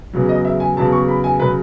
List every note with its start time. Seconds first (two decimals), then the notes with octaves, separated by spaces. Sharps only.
0.13 E2 C#3 F#3
0.29 D#5
0.45 E5
0.60 G#5
0.77 E2 C#3 F#3 A5
0.93 C#6
1.08 B5
1.24 G#5
1.39 C#3 F#3 B4